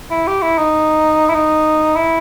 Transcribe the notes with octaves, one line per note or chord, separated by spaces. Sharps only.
E4
G4
E4
D#4
E4
D#4
E4